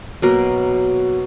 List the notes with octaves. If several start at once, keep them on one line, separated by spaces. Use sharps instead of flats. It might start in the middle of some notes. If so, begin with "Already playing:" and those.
B2 F#3 A#3 A#4